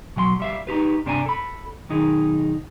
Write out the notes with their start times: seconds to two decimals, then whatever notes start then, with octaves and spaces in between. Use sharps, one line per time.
0.16 B2 F#3 F#5 C6
0.40 G3 E5 F5
0.67 D#4 F4 G4 B4
1.06 G2 C3 D4 A#4 G#5 A#5
1.26 A4 B5
1.89 B1 D#3 D#4 G#4